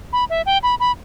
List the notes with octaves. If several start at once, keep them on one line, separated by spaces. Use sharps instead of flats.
B5
E5
G5
B5
B5